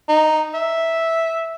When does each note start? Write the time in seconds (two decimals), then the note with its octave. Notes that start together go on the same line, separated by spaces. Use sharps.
0.09 D#4
0.54 E5